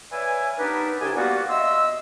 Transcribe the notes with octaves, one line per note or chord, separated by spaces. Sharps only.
B4 C#5 D5 E5 F5 G#5
B3 D4 D#4 G4 A#4 B4
C2 D4 G4 G#5
G3 A#3 B3 F4 F#4
D#5 E5 C6 E6